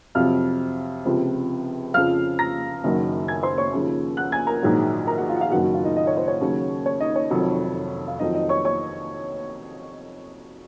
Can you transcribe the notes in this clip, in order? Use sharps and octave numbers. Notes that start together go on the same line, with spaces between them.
F2 C3 F#3 F5 F6
C#2 C3 F3
F2 C#3 F3 F5 F6
A#5 A#6
F#1 F#2 D#3 F#3
G#5 G#6
C5 C6
C#5 C#6
D#2 C#3 F3
F#5 F#6
G#5 G#6
A#4 A#5
A#1 G#2 D#3 F#3
A#4 A#5
F#4 F#5
F4 F5
F#5
F4 F5
F#1 F#2 D#3 F#3 F#4 F#5
F#4 F#5
F4 F5
D#4 D#5
D#5
C#5
C5
C#5
D#2 C#3 F#3
C#5
D#4 D#5
C#5
F1 F2 D#3 F#3
F5
F2 D#3 F#3 D#4 D#5
D#4 D#5
C#5 C#6
C#5 C#6